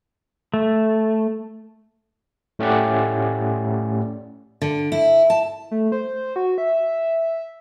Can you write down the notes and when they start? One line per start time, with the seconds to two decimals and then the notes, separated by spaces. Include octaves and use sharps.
0.54 A3
2.59 A2 A3 C#4 G4 D5 F#5
4.62 D3
4.92 E4
5.30 A5
5.71 A3
5.92 C5
6.36 F#4
6.58 E5